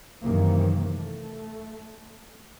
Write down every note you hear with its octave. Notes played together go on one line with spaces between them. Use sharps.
F#2 C3 D#3 E3 A#3
A3